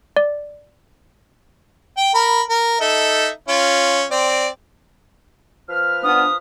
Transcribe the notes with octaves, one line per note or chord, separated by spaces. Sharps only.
D5
G5
A#4 B5
A#4
D#4 A4 E5
C#4 F4
C4 D5
F3 B4 F6
B3 D4 D#6